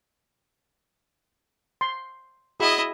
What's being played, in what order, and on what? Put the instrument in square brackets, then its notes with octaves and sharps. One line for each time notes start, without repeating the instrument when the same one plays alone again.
[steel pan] C6
[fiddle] E4 D#5 [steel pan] F#4 G#4